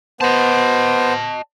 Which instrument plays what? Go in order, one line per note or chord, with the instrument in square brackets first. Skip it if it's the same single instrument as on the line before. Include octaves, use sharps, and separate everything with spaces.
[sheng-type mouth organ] B3 C5 [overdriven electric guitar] D#5 A5